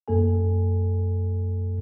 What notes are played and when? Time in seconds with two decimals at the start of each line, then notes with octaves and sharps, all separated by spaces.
0.08 F#2 A#3 A4 G#5